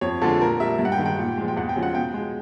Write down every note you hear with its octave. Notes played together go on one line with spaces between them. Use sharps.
F2 C#5
D3 F3 G#3 A4
A#2 A#4
G3 E5
G2
F#5
G5
D#3 G#3
G5
A#2
F3 G#3
G5
E2 F#5
G5
C#3 F3 G#3
F#5
B2 G5
G#3